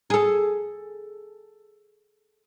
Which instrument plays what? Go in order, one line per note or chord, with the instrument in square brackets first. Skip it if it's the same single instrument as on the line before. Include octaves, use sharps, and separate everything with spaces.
[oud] G#4 A4